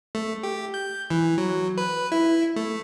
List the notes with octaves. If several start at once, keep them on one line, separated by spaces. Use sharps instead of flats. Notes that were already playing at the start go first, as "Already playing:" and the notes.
A3
G4
G6
E3
F#3
B4
E4
A3